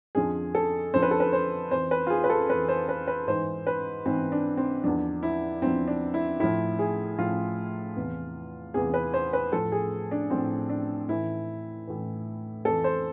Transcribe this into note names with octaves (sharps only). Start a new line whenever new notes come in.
F2 D3 F3 G#4
A4
F2 D3 F3 C5
B4
A4
B4
C5
F2 E3 C5
B4
F4
G#4
B4
A4
F2 E3 B4
C5
B4
B4
G#2 E3 C5
B4
G#2 E3 C4
D4
C4
E2 D3 F3 D4
E4
E2 D3 F3 C4
D4
E4
A2 F3 E4
G#4
A2 F3 F4
E2 C3 E3
E2 C3 E3 G#4
B4
C5
B4
A2 F3 A4
G#4
D4
A2 F3 C4
D4
A2 E3 E4
A2 E3
F2 E3 A4
C5